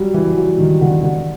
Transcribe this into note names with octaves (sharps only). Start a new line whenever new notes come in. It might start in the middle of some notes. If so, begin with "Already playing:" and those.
Already playing: F#3 G3
E3
F#3
D#3
D3
D3